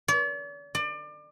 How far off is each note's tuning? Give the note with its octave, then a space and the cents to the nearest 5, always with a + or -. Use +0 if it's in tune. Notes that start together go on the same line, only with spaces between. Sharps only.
D5 -45
D5 +30